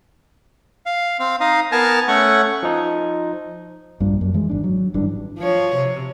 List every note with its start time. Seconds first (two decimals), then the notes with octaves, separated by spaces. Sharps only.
0.86 F5
1.20 C4 F5
1.40 D#4 D#5 F5
1.72 B3 A#4 G#5 A5 F6
2.08 A3 C#4 F#5 C#6
2.63 F3 D#4
4.00 A#1 G2 A#2 D4
4.21 F#2
4.34 E3 G#3
4.49 G#1 D4
4.64 F#3
4.94 G#1 G2 E3 D4
5.38 F3 C#5
5.76 C3